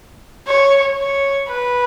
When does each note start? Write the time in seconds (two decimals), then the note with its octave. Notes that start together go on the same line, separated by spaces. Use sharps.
0.47 C#5
0.98 C#5
1.48 B4